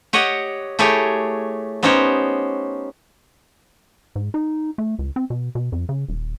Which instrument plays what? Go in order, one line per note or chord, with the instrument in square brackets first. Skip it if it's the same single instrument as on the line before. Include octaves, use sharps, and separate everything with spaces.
[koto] G4 C#5 D#5 F#5
A3 E4 G4 G#4 C#5
B3 C#4 D#4 G4 C5 C#5
[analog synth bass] G#2
D#4
A3
C#2
C4
B2
B2
F2
C#3
D#1